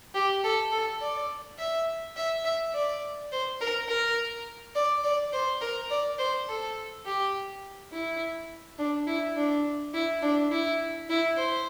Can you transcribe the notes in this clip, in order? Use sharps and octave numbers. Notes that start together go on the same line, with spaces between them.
G4
A4
A4
D5
E5
E5
E5
D5
C5
A#4
A#4
D5
D5
C5
A#4
D5
C5
A4
G4
E4
D4
E4
D4
E4
D4
E4
E4
C5